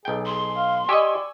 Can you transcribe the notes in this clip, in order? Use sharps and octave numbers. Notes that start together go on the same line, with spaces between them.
B1 G#4 G5
G#4 C6
F5
G4 D5 D#5 G#5 C#6 E6